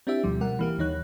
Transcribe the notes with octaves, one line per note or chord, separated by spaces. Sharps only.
C4 D4 E4 G4 E5
D2 B2 F3 G3
B2 G3 A#4 F#5
E3 A#3 G4
D#2 E3 D#4 C#5 F#6